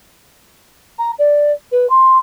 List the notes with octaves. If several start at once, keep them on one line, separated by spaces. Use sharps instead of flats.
A#5
D5
B4
C6